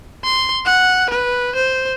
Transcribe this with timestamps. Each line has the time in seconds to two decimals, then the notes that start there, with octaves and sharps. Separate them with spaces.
0.24 C6
0.65 F#5
1.10 B4
1.56 C5